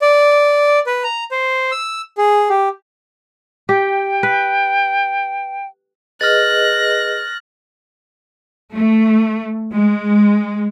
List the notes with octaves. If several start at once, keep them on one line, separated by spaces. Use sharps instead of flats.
D5
B4
A#5
C5
E6
G#4
G4
G4 G5
B4
G#4 B4 D#5 F6 F#6 A6 A#6
A3
G#3